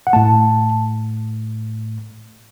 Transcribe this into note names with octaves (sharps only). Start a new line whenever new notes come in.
F#5
A2 A3 A5